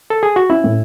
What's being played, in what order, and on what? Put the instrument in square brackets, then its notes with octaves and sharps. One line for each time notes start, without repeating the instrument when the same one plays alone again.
[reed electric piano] A4
G#4
F#4
[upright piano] C#4 [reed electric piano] E4
[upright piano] A2